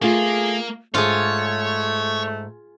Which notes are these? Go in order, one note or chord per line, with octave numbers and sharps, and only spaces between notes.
A3 A#3 F4 G#4
G#2 A3 F4 G#4 C#5